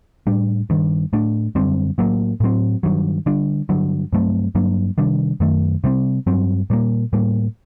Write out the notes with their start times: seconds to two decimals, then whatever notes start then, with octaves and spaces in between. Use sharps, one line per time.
0.27 A2 G3 D4
0.70 G2 D#3 G3
1.13 A2 A3 D4
1.55 F#2 D3 G3 C4
1.98 A2 F#3 A#3
2.40 A2 F#3 C4
2.83 G2 D#3 F#3
3.26 D3 G3 D4
3.69 G2 D3 F#3
4.13 G2 F#3 A3 C4
4.55 G2 F#3 A#3 D4
4.98 C3 D#3 G3 D4
5.40 F#2 D#3 A3
5.84 C3 G3 C4
6.27 G2 F#3 C4
6.70 A#2 G3 A#3
7.13 A2 G3 A#3